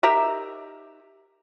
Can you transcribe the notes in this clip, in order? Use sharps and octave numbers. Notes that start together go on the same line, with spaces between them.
D#4 G4 A#4 E5